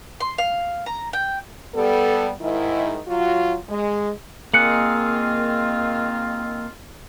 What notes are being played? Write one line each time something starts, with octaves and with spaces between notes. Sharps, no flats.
C6
F5
A#5
G5
G3 B3 A4
G#2 D#3 E4
F#3 F4 F#4
G#3
D#3 A#3 C4 F4 G#4 F#6 C#7 F#7